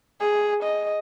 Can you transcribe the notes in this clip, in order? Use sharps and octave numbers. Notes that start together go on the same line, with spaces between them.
G#4
D#5